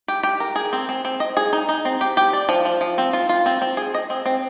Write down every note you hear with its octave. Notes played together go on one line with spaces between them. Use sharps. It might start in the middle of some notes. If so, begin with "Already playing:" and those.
G4
G4
A#4
G#4
C4
C4
C4
D#5
G#4
D#4
D#4
C4
G4
G4
D5
F3
F3
F3
C4
F4
F4
C4
C4
G#4
D#5
C4
C4